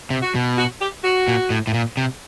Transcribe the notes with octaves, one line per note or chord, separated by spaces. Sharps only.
C3
F#4
B2
F#4
G4
F#4
A#2
A2
A2
A#2
C3